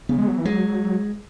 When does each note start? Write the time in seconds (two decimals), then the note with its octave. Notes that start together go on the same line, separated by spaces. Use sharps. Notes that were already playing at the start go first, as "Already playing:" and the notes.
0.09 C#3 B3
0.18 G#3
0.28 F#3
0.37 E3
0.45 F#3 G#3